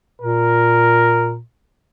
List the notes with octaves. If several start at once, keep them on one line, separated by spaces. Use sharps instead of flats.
A#2 A#4